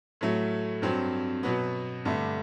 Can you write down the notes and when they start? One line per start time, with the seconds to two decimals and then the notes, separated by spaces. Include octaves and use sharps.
0.21 A2 F#3 A3
0.82 G2 F#3 C4
1.43 B2 F#3 B3
2.05 G2 D3 A3